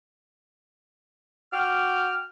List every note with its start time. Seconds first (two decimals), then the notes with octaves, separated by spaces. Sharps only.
1.53 F#4 G5 D6 F6